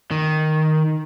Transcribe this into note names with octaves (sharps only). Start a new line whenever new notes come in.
D#3